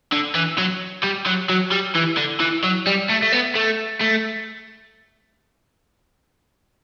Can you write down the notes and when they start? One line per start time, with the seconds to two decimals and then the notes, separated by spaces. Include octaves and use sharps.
0.12 D3
0.35 E3
0.58 F#3
1.04 G3
1.26 F#3
1.49 F#3
1.72 G3
1.96 E3
2.17 D3
2.40 E3
2.64 F#3
2.87 G3
3.09 A3
3.22 A3
3.32 B3
3.55 A3
4.00 A3